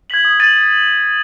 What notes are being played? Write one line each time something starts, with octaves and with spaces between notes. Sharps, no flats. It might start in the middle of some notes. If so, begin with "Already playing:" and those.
G#6 B6 F#7
D#6
A6 D#7 F#7